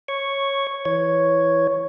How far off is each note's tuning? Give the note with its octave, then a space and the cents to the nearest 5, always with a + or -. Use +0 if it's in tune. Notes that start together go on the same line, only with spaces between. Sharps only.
C#5 -10 C#6 +0
E3 +0 C#5 +0